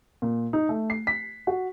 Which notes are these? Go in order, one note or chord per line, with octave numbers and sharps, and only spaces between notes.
A#2
D#4
A3
C7
B6
F#4